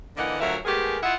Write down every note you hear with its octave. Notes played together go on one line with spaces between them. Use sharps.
D3 E3 A#3 D#4 D#5 F#5
D2 F#3 F4 A#4 E5
G#3 A3 B3 G4 G#4 A#4
E4 F4 D#5 E5 F#5